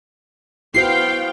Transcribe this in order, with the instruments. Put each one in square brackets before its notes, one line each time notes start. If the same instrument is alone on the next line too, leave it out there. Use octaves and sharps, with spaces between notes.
[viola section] B3 F5 G5 [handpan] E4 F#4 C5 [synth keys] C7